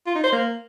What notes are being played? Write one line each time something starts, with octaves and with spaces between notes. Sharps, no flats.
F4
D#4
C5
A#3